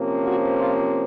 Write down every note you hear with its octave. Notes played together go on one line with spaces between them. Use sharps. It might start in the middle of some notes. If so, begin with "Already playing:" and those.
Already playing: C3 F3 A#3 C#4
F#4
F4